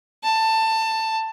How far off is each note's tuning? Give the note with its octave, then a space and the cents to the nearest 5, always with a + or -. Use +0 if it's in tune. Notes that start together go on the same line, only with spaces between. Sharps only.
A5 +15